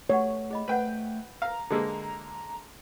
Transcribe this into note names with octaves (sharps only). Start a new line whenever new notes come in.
A3 G4 B4 C#5 F#5
G#4 D#5 B5
A3 B4 C5 F#5 G5
F5 A#5
D3 G#3 A#3 G4 D#5